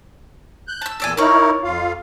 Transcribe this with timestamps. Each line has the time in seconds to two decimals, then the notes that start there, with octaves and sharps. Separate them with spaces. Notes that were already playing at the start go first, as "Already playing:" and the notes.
0.67 F#6 G6
0.82 A5 E6
1.00 E2 A#2 A4 D5 G#5 E6
1.17 D#4 E4 A#4 C#5 D5
1.63 F2 F4 F5